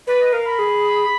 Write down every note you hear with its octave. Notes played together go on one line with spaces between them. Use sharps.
B4 D5
D#5
A#4 F5
B5
G#4